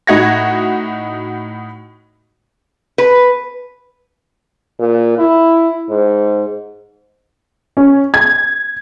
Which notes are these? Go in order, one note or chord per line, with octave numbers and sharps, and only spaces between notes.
A2 D#4 F#4 F#5 G#6 A#6
B4
A#2
E4
G#2
C#4
G#6